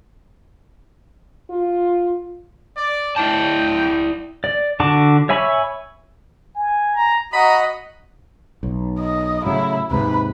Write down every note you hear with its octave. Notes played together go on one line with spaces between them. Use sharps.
F4
D5
E4 D5 G5 A5
D5
D3 F#4 A5 D6
C#5 E5 G#5 B5 C#6
G#5
A#5
F#4 D#5 F#5 A#5 B5
B1
D#5
A2 C#3 F#3 E4
D#2 G#2 C3 B4